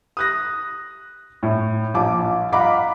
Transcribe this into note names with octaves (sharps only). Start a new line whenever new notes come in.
D#6 F#6 A#6
A2
A#1 A5 D6
D#5 F5 F#5 A#5 B5 D6